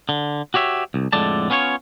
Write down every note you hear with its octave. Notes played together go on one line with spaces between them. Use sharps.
D3
F#4 G4 C#5 E5
C2
F2 A2 D3 G#3 D5 A5
B3 C#4 F4 C5 C#5